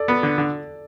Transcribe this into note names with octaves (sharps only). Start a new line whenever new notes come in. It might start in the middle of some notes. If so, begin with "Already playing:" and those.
Already playing: A4 D5
B3
D3
D3